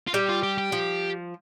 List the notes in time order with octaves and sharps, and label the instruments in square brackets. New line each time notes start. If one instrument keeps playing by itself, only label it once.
[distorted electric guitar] F4
[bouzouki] G3 [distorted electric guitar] G4
[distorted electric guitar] F4
G4
G4
[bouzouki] F3